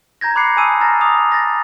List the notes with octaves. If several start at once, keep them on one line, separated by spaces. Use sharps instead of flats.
A#5 G6 G#6 A#6
B5 D6 F#6 G#6 C7 C#7
G#5 A5 B5 D#6 E6 D#7
A#5 F6 A6 A#6
D6 D#6 F7
A6 A#6